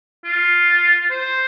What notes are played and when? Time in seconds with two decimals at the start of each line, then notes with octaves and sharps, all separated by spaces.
0.25 F4
1.11 C5